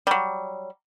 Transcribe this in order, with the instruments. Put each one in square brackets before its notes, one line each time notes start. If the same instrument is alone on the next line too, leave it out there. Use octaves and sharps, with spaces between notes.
[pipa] F#3 G3